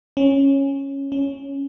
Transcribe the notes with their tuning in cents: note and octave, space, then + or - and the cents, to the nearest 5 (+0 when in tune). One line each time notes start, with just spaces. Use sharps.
C#4 -10
C#4 +0